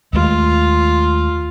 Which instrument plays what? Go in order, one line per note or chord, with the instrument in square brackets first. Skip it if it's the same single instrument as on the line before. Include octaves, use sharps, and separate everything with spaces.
[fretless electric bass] D#2 G#3 A3 [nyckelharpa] F4